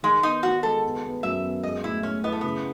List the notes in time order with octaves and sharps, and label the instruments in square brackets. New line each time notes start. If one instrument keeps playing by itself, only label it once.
[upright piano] D#3 [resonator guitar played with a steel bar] G#3
[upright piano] B3 [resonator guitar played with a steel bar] D#4
[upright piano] D#3 [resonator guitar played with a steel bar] F#4
[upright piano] G#3 [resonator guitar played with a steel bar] A4
[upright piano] B3
B3
[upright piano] F#2 [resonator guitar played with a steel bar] E5
[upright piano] B3
[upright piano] G#3 [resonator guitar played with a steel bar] D#5
[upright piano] A2 [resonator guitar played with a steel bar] E4
[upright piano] A2 [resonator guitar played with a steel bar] C#4
[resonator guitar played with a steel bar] B3 [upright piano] E4
[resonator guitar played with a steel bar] A3
[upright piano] C#3 [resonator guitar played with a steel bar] B3